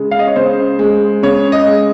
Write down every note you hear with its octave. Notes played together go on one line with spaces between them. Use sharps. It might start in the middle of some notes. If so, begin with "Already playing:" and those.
Already playing: C#3 G#3
F5
D#5
C#5
C#3 C5
G#3
C#3 C#5
D#5
G#3